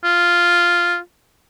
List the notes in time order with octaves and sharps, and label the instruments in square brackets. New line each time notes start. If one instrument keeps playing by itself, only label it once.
[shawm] F4